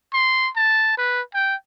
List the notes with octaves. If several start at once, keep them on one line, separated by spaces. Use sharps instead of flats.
C6
A5
B4
G5